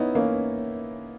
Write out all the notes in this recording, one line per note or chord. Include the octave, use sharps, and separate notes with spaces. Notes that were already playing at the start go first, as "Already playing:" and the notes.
Already playing: B3 C#4 D#4 E4
A#3 C#4